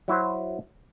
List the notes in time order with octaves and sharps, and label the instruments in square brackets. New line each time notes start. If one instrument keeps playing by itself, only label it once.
[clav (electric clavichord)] F#3 E4 F#4 C5